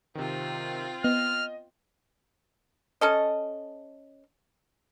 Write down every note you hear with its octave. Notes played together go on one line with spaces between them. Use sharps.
C3 D#3 C4 F4
B3 D#5 F6
C#4 A4 D#5